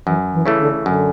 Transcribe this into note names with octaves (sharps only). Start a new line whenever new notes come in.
F#2 E3
E3
C#3 E3 A3
D3
F#2 D3